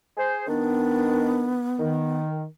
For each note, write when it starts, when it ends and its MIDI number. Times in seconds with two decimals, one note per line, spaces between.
0.17 0.46 68
0.17 0.46 72
0.47 1.58 51
0.47 2.19 59
0.47 1.58 62
1.79 2.44 51